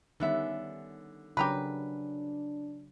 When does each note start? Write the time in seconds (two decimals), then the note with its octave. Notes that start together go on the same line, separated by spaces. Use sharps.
0.20 D3 D#3 G3 B3 C#4 E5
1.37 C#3 F#3 C#4 D4 G4 A#4 B4